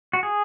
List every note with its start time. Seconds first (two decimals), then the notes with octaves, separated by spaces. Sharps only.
0.13 F#4
0.23 G#4